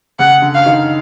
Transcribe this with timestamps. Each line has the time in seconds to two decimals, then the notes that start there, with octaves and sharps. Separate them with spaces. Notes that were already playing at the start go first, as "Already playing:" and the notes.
0.19 C#3 F#5
0.42 D3
0.55 F5
0.66 D#3